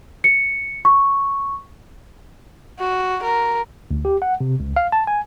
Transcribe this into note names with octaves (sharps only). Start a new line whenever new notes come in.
C#7
C#6
F#4
A#4
D2
G4
F#5
C3
C#2
F5
A5
G#5